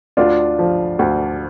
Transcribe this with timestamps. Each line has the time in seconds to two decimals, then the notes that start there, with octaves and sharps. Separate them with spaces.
0.17 D2 D4 F4
0.59 F3
0.99 D2